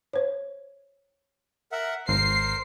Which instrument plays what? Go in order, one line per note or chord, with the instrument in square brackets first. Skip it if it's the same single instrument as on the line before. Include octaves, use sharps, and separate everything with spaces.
[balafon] C5 C#5
[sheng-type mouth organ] A#4 E5 F#5
[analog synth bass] G#1 [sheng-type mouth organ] A#4 C5 [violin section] C7